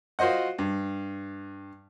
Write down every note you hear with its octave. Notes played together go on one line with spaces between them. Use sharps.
F4 F#4 C5 D#5 F#5
G2